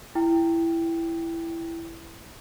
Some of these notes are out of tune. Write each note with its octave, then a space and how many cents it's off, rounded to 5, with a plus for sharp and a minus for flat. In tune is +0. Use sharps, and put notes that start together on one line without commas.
E4 +10 G5 +0